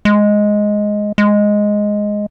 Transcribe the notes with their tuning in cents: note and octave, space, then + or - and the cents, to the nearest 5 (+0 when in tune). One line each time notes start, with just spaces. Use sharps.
G#3 +5
G#3 +0